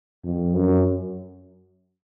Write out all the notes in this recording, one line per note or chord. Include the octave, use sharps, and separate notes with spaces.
F2
F#2